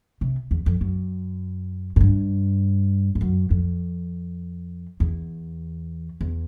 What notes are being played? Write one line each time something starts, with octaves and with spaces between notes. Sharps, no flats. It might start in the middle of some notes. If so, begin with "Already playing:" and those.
C3
E2
F2
F#2
G#2
G2
F2
F#2
F2
E2
E2